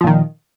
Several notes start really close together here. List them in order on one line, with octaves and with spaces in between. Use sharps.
F3 A#2 D#3